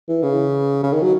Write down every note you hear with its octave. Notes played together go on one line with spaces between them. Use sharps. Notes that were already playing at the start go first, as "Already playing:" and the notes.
E3
C#3
C#3
D#3
F#3